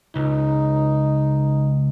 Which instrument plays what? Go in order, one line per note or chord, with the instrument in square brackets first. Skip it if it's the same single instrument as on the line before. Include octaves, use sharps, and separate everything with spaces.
[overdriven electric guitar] C#2 [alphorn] D#4